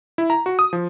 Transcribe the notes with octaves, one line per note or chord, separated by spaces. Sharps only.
E4
A#5
F#4
D#6
F3